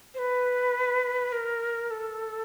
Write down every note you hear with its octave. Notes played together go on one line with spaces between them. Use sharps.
C5
B4
A#4
A4